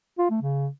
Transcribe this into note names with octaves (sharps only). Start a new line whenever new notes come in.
F4
A3
C#3